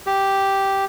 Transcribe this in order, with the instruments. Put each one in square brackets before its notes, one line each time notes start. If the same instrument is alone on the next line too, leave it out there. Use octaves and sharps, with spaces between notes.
[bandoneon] G4